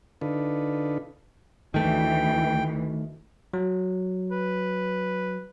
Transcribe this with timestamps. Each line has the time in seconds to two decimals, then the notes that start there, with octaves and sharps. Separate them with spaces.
0.21 D3 D4 D#4 F4 A4 B4
1.74 D2 D#3 E3 A3 G5
3.54 F#3
4.31 B4